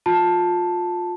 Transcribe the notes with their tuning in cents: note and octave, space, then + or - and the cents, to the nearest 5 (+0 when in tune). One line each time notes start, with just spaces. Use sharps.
F4 +25 A5 +0